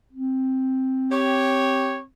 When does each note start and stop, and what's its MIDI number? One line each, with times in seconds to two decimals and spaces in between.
0.13 2.05 60
1.11 1.99 67
1.11 1.99 73